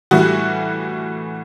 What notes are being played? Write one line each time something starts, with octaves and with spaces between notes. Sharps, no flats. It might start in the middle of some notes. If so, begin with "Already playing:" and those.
A2 E3 G3 F#4